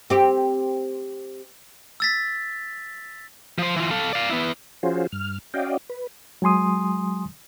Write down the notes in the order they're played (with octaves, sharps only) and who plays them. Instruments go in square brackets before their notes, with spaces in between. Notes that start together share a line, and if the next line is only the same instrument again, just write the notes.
[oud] C4 G4
[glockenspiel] E6 A6 B6
[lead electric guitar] F3 C5
E3 F4
A4 F5
D5 F5
B3 E4
[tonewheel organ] F3 C#4 F4 F#4 G#4 C5
G2 F6
C#4 F#4 D5 D#5 F5 G5
B4
[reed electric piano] F#3 G#3 G#5 C6 D#6